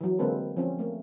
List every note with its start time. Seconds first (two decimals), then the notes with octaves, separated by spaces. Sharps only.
0.01 E3 F#3
0.19 D3 G#3 A#3 C4 A4 B4
0.57 F3 C4 C#4
0.79 A3 A#3